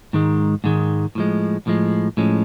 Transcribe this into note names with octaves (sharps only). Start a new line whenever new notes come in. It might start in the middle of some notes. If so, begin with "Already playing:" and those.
G#2 D#3 G#3
G#2 D#3 G#3
A2 F3 G#3
A2 F3 G#3
A2 F3 G#3 C#4